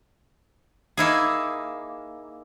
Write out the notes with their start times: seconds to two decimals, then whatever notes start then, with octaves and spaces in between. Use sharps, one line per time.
0.97 A#3 D#4 E4 G#4